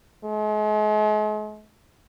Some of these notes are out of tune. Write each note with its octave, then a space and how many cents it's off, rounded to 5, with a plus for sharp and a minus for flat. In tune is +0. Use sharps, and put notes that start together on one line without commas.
G#3 +40